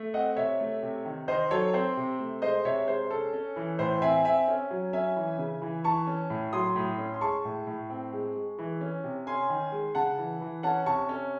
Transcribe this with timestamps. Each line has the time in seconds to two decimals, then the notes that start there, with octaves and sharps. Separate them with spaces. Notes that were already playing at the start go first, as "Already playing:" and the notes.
Already playing: A3
0.14 C4 D#5 F#5
0.36 C3 C#5 E5
0.60 A3
0.83 C3
1.05 D#3
1.28 D#3 C5 D#5
1.51 F#3 A4 C#5
1.74 C4 C5
1.97 C3
2.19 A3
2.42 G#3 C5 D#5
2.65 C3 C#5 E5
2.88 G#3 C5
3.10 C#4 A4
3.33 C#4
3.56 E3
3.79 A2 C5
4.02 C4 E5 G#5
4.25 C4 E5 G#5
4.48 C#4
4.71 F#3
4.93 C#4 E5 G#5
5.16 E3
5.38 C#3
5.62 E3
5.84 E3 A5 C#6
6.07 C#4
6.30 A2
6.53 F#3 C6 D#6
6.76 A2
6.98 C#4
7.14 C6
7.21 G#3 A5 C#6
7.45 A2
7.67 A2
7.90 C4
8.13 G#3
8.35 G#3
8.58 E3
8.81 C#4
9.04 C3
9.27 C#4 G#5 C6
9.50 D#3
9.72 G#3
9.95 C#3 F#5 A5
10.18 E3
10.41 E3
10.63 C#4 F#5 A5
10.86 C3 A5 C#6
11.09 C#4